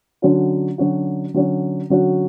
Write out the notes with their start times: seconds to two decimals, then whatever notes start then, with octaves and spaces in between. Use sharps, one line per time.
0.22 D3 F#3 C#4 F#4
0.78 D3 F#3 C#4 F#4
1.34 D3 F#3 C#4 F#4
1.90 D3 F#3 C#4 F#4